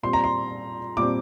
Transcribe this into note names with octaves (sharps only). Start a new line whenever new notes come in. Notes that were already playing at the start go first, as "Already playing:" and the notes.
A#2 G3 C4 C6
A#5
C6
A#2 G3 C4 D6